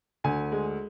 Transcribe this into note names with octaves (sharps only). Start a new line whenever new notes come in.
D2 G#5
G#3